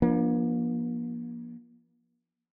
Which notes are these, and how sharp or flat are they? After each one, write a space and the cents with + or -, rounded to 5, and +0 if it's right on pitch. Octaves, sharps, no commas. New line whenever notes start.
F3 -20 A#3 +35 D4 +0